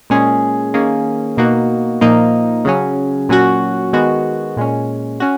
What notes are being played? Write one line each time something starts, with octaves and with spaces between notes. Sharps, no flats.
A#2 G#3 C#4 G#4
D#3 A#3 C#4 G#4
B2 A#3 D#4 F#4
A#2 F3 A#3 D#4
C#3 F#3 C#4
A#2 F#3 C#4 F#4
D#3 G#3 B3 F#4
A#2 G#3 C#4
C#4 F#4